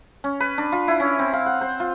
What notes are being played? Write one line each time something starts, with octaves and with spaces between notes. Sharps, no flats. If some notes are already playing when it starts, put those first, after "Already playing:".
C#4
B4
D4
F4
E4
C#4
C4
F5
F#5
C5
F4